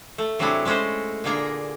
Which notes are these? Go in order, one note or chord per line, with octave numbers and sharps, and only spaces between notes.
A3
C3 F#3 A3 D4 E4 G#4
G#3 A3 C#4 F#4 C5
A#2 D3 A#3 G#4 A#5